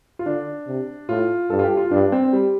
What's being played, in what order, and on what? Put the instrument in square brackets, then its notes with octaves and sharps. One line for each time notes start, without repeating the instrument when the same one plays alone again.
[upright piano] F4
[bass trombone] D3 [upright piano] D4
[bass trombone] C3
[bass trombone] A2 [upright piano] F4
[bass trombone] G2 [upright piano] A4
[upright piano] F4
G4
F4
[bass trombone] G2 [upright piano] D4
[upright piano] C4
G3